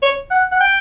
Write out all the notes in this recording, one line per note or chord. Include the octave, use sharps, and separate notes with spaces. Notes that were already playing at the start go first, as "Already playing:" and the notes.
C#5
F#5
F#5
G5